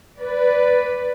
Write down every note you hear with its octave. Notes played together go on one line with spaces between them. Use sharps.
B4 D5